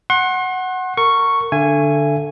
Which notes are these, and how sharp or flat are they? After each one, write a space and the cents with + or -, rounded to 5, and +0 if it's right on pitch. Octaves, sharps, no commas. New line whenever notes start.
F#5 +0 C6 +40
A#4 -25 C#6 +0
D3 +0 E5 +40 G#5 -5